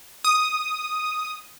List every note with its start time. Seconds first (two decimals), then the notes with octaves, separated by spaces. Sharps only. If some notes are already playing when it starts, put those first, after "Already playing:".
0.25 D#6